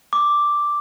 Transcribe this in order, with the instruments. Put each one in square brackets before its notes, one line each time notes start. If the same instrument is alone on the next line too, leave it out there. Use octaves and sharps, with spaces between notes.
[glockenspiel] D6